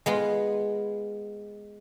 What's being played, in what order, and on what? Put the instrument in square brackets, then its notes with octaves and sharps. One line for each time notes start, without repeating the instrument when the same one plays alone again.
[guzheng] G#3 B3 F4